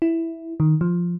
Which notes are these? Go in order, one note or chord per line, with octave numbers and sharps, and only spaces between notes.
E4
D#3
F3